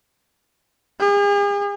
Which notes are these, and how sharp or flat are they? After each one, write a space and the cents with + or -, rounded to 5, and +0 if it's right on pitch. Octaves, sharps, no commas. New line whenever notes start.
G#4 -45